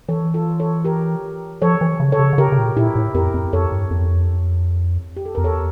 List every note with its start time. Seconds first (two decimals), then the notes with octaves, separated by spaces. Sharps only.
0.09 E3 A4 C#5
0.34 F4 A4
0.60 A4 C#5
0.84 G4 A#4
1.62 F3 A4 C#5
1.81 E3
2.00 C#3
2.12 A4 C#5
2.19 C#3
2.33 D3
2.38 C#3 G4 A#4
2.52 C#3
2.58 A#2
2.76 A#2 E4 G4
2.95 A2
3.14 F2 G4 A#4
3.34 F2
3.53 F2 A4 C#5
3.72 G2
3.91 F2
5.17 G4
5.26 A4
5.35 F2 A#4
5.44 E2 A4 C#5